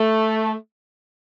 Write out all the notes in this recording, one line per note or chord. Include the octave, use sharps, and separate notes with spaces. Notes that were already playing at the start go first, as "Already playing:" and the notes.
Already playing: A3